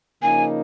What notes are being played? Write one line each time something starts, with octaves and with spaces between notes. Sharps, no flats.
C#3 F3 A#3 D#4 G#5